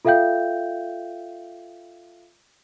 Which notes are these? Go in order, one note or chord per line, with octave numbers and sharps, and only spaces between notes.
F4 A4 E5 F5 G5 G6